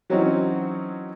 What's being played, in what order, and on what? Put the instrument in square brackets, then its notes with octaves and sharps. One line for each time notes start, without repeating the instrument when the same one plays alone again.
[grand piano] E3 F#3 C4 C#4 D#4 F#4